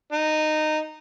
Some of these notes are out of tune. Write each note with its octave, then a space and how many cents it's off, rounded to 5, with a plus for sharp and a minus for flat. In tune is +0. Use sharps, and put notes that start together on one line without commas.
D#4 -15